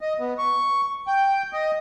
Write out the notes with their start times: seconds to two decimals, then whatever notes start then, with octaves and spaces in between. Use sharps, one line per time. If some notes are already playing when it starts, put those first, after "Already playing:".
0.01 D#5
0.20 B3
0.38 C#6
1.07 G5
1.53 D#5